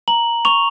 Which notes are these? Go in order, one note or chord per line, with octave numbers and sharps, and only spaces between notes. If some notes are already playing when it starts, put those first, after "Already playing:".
A#5 F#7
C#6 F7